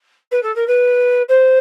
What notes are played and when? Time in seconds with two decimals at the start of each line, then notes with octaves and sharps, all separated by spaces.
0.31 B4
0.42 A4
0.55 A#4
0.67 B4
1.28 C5